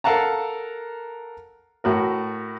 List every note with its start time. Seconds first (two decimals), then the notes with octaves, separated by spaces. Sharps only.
0.04 A4 A#4 F5 F#5 A5 A#5
1.84 A2 F#4 A#4